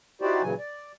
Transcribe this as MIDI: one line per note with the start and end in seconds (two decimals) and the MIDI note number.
0.21 0.42 63
0.21 0.42 64
0.21 0.42 66
0.21 0.42 67
0.21 0.42 72
0.21 0.42 74
0.43 0.54 46
0.43 0.54 49
0.43 0.54 52
0.43 0.54 54
0.43 0.54 80
0.59 0.92 74